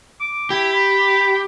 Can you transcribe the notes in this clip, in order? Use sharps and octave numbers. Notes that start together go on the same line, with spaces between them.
D6
E4 G4
B5